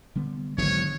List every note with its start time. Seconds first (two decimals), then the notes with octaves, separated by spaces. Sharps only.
0.16 D3 G3 B3
0.58 G#1 B2 D3 F#3 B3 C#5